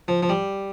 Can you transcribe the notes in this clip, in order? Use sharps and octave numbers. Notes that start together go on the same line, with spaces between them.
F3
F3
G3